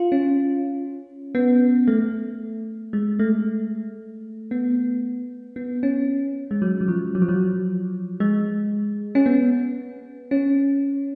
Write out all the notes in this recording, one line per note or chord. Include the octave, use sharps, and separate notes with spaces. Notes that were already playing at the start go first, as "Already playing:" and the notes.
Already playing: F4
C#4
B3
A3
G#3
A3
B3
B3
C#4
G#3
F#3
F#3
F3
F#3
F3
F#3
G#3
C#4
B3
C#4